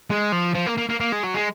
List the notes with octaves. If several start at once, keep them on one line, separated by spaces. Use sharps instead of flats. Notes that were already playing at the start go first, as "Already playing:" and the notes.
G#3
F3
F3
A#3
A#3
A#3
A#3
G#3
F#3
G#3